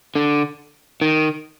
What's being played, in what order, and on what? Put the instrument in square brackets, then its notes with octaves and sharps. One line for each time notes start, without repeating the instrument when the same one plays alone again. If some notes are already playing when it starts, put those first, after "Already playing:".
[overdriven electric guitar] D3
D#3